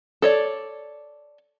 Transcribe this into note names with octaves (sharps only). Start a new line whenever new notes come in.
A4 C#5 D5